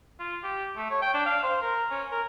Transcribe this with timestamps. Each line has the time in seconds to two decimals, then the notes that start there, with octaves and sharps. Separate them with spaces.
0.19 F4
0.43 G4
0.77 A3
0.90 C#5
1.02 G5
1.14 D4
1.26 F5
1.43 C5
1.62 A#4
1.90 C#4
2.12 A#4